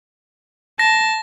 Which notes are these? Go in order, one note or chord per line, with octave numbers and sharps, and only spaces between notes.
A5 A#6